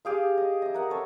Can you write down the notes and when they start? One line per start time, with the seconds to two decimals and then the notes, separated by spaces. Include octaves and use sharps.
0.05 G4 G#4 F5
0.37 D#5
0.62 D#5 E5
0.74 A#4 F#5
0.90 A4 C#5